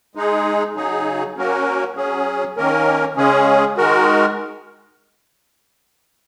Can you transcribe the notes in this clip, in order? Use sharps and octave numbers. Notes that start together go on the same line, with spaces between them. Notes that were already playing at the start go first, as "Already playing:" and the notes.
G#3 D#4 G#4
C#3 F#3 D#4 G#4
F#3 A#3 C#4 F#4 A#4
F#3 C#4 G#4
D#3 A#3 C#4 A#4
C#3 G#3 C#4 G#4
D#3 G#3 F#4 A#4